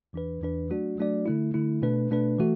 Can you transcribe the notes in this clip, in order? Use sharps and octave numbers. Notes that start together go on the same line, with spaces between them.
E2 E3 D4 B4
E2 E3 D4 B4
F#3 A3 D4 F#4 D5
F#3 A3 D4 F#4 D5
D3 A3 E4
D3 A3 E4
B2 A3 D4 B4
B2 A3 D4 B4
E3 A3 F#4